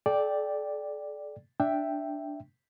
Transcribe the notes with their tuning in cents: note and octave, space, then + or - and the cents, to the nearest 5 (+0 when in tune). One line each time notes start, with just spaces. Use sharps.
A4 -45 D5 +0 G5 +0
D4 +0 E5 +0 G5 +0